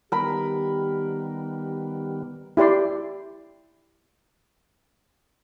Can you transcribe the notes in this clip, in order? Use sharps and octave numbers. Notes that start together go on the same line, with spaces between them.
D#3 G3 B3 G4 A#4 B5
G4
E4 G4 D5 C6